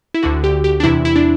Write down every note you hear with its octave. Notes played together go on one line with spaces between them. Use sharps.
E4
D2 D3 F#4
G4
G4
D4
E2 C3 E3 E4
E4
D4